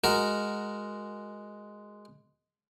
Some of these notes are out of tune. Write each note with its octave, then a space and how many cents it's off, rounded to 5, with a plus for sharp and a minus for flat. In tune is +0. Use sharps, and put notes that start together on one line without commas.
G#3 +0 F#4 +5 A#4 +0